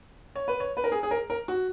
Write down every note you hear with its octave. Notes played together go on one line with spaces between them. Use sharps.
C#5
B4
C#5
B4
A#4
G#4
G#4
A#4
A#4
F#4